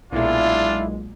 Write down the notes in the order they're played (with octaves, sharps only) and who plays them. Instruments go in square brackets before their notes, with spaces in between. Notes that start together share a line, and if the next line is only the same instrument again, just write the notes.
[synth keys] B1 A#2 G#3 [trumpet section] D4 F4 [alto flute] E4